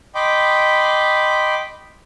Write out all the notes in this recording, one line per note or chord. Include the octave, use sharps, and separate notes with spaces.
D#5 G5 B5 C6 D6